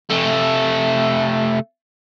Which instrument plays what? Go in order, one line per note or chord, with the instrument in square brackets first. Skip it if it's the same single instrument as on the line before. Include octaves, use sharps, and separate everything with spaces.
[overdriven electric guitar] C3 A3